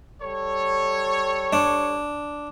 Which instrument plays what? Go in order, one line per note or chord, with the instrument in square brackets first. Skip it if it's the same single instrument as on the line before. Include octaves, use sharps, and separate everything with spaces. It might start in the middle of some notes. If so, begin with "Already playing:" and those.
[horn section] G3 A4 C#5
[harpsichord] D4